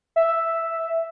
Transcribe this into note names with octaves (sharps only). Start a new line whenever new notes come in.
E5